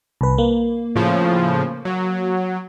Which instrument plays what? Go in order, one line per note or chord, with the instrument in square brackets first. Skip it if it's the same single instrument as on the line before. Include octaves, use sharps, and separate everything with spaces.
[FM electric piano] C2 B4
A#3
[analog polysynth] A2 C#3 F3
F#3